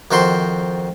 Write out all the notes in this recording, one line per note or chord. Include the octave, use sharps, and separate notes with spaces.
F2 D#3 F#4 C5 C6